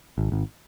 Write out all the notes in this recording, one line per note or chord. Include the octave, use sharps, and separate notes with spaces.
G#1
G#1